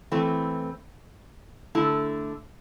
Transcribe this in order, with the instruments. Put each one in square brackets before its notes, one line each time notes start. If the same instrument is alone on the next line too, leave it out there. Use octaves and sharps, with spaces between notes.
[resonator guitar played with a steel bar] E3 A3 C4
D3 A3 E4